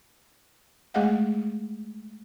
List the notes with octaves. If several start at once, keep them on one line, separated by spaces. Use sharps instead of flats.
G#3 A3 G#4 D#5 F5 F#5